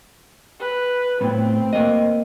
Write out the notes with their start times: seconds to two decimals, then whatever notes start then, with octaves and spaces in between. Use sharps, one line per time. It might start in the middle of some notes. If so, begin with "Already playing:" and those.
0.59 B4
1.21 A2 B3 C4
1.73 A#3 D#5